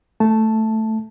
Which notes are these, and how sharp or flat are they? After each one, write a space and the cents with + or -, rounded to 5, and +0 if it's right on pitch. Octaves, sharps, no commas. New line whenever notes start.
A3 +0 A5 +0